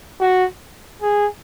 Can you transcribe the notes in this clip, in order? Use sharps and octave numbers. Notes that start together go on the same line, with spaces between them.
F#4
G#4